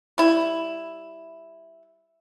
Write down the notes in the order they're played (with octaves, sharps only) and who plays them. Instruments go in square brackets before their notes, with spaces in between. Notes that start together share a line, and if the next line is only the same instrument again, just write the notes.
[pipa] G3 E4